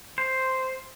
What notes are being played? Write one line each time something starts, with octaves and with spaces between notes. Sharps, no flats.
C5